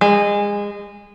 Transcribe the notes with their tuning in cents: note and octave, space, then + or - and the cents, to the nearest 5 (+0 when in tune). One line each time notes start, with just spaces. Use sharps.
G#3 -25